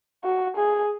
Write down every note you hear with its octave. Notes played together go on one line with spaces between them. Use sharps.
F#4
G#4